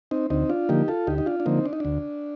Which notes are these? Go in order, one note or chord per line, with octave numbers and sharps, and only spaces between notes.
C4 D#4
D2 C4 D#4
D4 F4
D3 F3 A#3 D#4 G4
F4 A4
D2 D#4 G4
D#4
D4 F4
D4
D3 F3 A#3 C4 D#4
D4
D#4
D2 D4